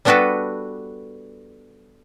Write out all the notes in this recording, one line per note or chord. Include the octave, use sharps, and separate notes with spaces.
G3 B3 D4 F#4 A4 B4